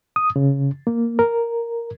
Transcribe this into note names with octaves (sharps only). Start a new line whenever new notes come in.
D#6
C#3
A#3
A#4